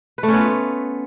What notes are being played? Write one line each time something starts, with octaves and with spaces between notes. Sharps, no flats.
B4
A3
C#4
B3
F4